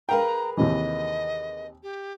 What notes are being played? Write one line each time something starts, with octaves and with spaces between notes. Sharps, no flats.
G#4 A#4 B4 F5 G5 A#5
D#2 C3 E3 D#5
G4